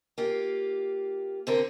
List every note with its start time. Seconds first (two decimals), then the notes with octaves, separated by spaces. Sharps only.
0.18 A#3 F4 G4
1.47 D3 C4 A#4